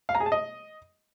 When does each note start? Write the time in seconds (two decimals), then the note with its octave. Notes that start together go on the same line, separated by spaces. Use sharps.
0.09 F5
0.15 A#5
0.20 G#4
0.26 A5
0.32 D#5